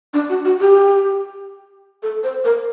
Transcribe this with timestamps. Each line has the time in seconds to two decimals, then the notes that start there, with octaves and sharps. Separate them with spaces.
0.14 D4
0.29 F#4
0.45 F#4
0.61 G4
2.03 A4
2.24 C5
2.44 A#4